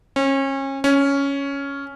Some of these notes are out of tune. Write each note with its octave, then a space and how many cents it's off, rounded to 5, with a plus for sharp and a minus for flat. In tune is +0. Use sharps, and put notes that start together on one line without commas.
C#4 -30
C#4 +5